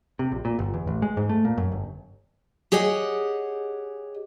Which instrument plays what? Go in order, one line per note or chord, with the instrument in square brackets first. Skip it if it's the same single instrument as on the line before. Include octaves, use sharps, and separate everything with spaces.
[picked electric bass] C3
A#1
A#2
G1
E2
A1
G#3
G#2
A3
A#2
F#2
G1
[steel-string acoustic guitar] G4 G#4 C#5 D#5 F#5